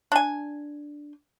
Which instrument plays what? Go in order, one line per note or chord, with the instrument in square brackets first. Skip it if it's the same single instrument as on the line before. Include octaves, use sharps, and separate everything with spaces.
[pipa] D4 G#5